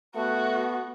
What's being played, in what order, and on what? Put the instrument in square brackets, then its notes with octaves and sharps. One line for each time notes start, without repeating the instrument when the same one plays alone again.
[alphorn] A3 [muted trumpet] B3 [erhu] F#4